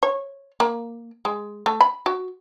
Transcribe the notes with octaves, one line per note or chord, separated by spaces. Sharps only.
C#5
A#3
G#3
A3
B5
F#4